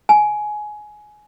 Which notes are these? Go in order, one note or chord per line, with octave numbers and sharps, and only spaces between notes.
G#5